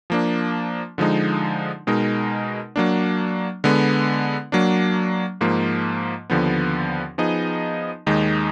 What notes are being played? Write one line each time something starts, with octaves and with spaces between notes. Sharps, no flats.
F3 A#3 D4
D3 F3 G#3 D#4
B2 G#3 D#4 A#4
F#3 A#3 D4
D3 G#3 B3
F#3 A#3 D4
G#2 F3 A#3
D#2 D3 F3 B3
F3 B3 D#4 G#4 D#5
D#2 D#3 G#3 D#4